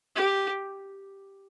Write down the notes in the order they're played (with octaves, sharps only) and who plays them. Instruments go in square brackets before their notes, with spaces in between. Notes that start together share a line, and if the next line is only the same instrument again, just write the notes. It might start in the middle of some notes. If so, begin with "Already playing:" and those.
[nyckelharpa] G4